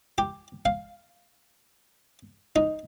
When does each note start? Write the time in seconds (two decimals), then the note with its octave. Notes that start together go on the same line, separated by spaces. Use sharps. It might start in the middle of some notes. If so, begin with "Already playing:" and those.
0.18 G4
0.65 F5
2.56 D#4